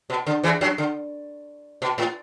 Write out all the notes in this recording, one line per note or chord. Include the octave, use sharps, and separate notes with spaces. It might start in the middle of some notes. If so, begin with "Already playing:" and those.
B2
D3
E2 E3
F#2 F#3
D3
B2
A2